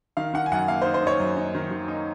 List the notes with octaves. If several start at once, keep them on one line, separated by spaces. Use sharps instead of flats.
D#3 F5
D#3 F#5
G#5
F#2 F#5
A#3 F5
C5
D#4
C5
D#4 C#5
F#2
D#4
D#3
D#3
D#4